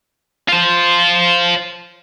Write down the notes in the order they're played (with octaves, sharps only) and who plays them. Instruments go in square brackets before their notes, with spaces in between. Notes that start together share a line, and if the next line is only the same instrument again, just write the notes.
[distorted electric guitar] F4 C5